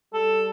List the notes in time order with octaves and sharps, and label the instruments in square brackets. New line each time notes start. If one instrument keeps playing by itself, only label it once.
[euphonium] G3 [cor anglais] A4